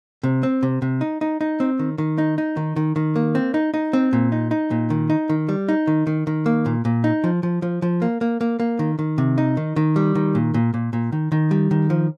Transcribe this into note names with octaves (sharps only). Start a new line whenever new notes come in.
C3
C4
C3
C3
D#4
D#4
D#4
C4
D#3
D#3
D#4
D#4
D#3
D#3
D#3
A#3
C4
D#4
D#4
C4
A#2
D#4
D#4
A#2
D#3
D#4
D#3
G3
D#4
D#3
D#3
D#3
A#3
A#2
A#2
D#4
F3
F3
F3
F3
A#3
A#3
A#3
A#3
D#3
D#3
C3
D#4
D#3
D#3
G3
D#3
A#2
A#2
A#2
A#2
D#3
D#3
G3
D#3
F3